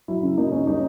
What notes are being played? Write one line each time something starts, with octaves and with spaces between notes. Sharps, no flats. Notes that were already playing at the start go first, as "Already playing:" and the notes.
F#3 E4
C#3
A#3 D#4
C#4
G3 D#4